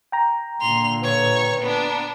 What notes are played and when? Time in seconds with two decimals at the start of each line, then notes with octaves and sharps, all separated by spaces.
0.12 G5 A#5
0.61 A#2 D3 C6 F7
1.03 B4 C#5 C#6
1.61 B3 D4